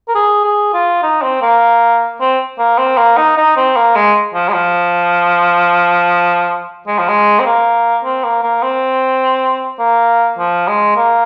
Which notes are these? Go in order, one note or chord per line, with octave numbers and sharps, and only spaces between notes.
A#4
G#4
G#4
F4
D#4
C4
A#3
C4
A#3
C4
A#3
D#4
D#4
C4
A#3
G#3
F3
G#3
F3
G#3
F3
G#3
C4
A#3
C4
A#3
A#3
C4
A#3
F3
G#3
A#3